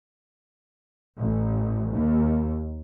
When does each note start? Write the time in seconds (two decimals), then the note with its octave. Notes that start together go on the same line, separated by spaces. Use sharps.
1.18 A1
1.92 D#2